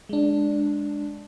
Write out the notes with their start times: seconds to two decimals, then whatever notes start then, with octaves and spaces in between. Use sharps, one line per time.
0.09 G#3 D4